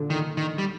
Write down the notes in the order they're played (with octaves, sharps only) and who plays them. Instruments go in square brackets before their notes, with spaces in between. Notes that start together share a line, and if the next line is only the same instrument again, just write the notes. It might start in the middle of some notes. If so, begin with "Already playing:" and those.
Already playing: [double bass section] A#2 D3
[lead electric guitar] D#3
D#3
G3